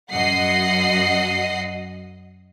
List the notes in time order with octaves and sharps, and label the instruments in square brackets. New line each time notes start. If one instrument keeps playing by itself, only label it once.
[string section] F#2 D#5 F#5 C7